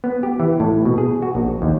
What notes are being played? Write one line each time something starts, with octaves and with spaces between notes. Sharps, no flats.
B3
G4
E3
A2
B2
G#4
F#4
A#1
D#2